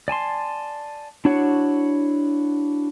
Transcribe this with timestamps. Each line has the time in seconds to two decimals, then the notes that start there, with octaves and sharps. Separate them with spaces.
0.08 D5 G#5 A5 C6
1.25 D4 E4 F#4 C#5 F#5